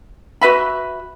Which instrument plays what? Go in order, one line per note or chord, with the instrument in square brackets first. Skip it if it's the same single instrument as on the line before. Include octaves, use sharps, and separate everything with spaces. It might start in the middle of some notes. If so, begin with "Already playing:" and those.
[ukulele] F#4 B4 E5 B5